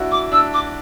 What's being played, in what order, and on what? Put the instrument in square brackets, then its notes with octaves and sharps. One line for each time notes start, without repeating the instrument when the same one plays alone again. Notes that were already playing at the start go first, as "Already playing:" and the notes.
Already playing: [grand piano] D4 E4 F#4
[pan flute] D6
[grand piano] D4 [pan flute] E6
[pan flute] D6